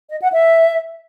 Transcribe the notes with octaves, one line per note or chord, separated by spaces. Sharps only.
D#5
F#5
E5